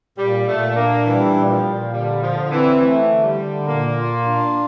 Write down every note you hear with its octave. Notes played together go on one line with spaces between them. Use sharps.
A#2 G3
A#2 A3
A#3 D4
E3 G3
A#2
F3
A#2
D3 G3
D3 F3
E3 C4
E3 A3
D3
G3
D3
A#2 A#3
F4
D4